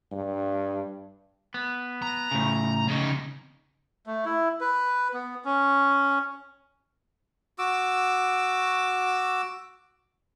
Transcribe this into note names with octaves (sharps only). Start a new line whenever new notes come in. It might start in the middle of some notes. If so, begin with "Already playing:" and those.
G2
B3
A#5
A2 C#3
C#3 D#4
A3
E4
B4
B3
C#4
F#4 D6 E6